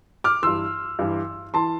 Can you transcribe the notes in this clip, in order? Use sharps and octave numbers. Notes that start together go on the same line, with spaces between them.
D6 F6
G2 E3 C6 E6
G2 E3
E3 A5 C6